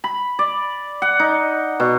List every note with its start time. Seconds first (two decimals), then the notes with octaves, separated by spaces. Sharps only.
0.04 B5
0.39 D5
1.02 F#5
1.20 D#4
1.80 B2